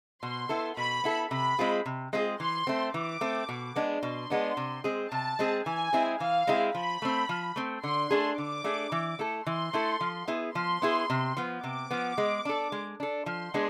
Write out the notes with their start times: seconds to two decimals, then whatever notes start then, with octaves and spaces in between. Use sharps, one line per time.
0.23 B2 C6
0.49 B3 E4 A4
0.77 B2 B5
1.04 B3 E4 A4
1.31 C3 B5
1.59 G#3 C4 F4 G#4
1.86 C3
2.13 G#3 C4 F4 G#4
2.40 E3 C6
2.67 A3 C4
2.94 E3 D6
3.21 A3 C4
3.49 B2
3.76 G#3 B3 D4
4.02 B2 C6
4.30 G#3 B3 D4
4.57 C3
4.84 G#3 C4 G#4
5.11 C3 A5
5.39 G#3 C4 G#4
5.66 E3 G#5
5.93 G#3 C4 E4 G#4
6.20 E3 F5
6.47 G#3 C4 E4 G#4
6.74 F3 B5
7.02 A3 C4
7.29 F3
7.56 A3 C4
7.83 D3 C6
8.11 A3 D4 G#4
8.37 D3 D6
8.64 A3 D4 G#4
8.92 E3
9.19 A3 E4 A4
9.46 E3 C6
9.73 A3 E4 A4
10.01 F3
10.28 B3 E4 G#4
10.55 F3 C6
10.82 B3 E4 G#4
11.10 C3
11.37 F3 B3
11.63 C3 D6
11.91 F3 B3
12.18 G#3
12.45 D4 A4
12.72 G#3
13.00 D4 A4
13.26 F3 C6
13.54 G#3 B3 D4 G#4